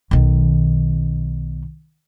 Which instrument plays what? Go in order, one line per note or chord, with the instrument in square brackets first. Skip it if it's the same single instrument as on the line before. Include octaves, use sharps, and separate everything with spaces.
[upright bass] B1 D#3